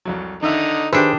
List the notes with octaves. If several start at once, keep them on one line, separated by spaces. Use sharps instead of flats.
C2 F2 F#3
D3 D#3 D#4 E5
D#3 D4 G4 G#4 B4 C5 E5